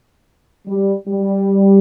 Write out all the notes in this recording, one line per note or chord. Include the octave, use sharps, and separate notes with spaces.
G3
G3